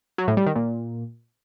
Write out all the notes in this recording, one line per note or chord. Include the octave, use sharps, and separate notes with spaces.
F#3
A2
G3
D#3
A#2